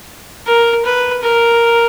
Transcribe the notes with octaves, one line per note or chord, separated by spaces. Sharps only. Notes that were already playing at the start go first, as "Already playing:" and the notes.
A#4
B4
A#4